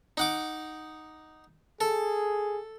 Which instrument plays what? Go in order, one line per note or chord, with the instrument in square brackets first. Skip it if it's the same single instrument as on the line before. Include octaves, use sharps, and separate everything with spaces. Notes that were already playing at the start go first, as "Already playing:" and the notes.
[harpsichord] D#4 F#5 D6
[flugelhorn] G#4 [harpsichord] A4